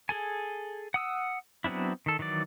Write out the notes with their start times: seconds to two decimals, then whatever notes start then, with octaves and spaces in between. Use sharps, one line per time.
0.09 G#4 A4 G#5
0.94 F#5 D#6 E6
1.64 F#3 B3 C4 D4 E4
2.06 D#3 A4
2.19 D#3 E3 F#3 D5